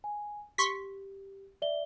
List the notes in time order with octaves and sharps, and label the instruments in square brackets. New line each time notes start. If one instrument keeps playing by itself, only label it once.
[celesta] G#5
[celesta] G4 [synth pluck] C6 C#6 B6
[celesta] D5 E5 G7